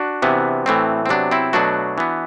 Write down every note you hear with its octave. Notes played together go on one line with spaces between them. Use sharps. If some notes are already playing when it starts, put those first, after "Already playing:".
Already playing: D4 F#4
C3 E3 B3
A2 E3 A3 C4
C4
C3 F#3 B3 D4
C4 E4
B2 F#3 A3 D4 F#4
E3 B3